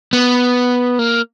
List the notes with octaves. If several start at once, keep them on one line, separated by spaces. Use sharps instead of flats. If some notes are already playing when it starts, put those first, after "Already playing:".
B3
A#3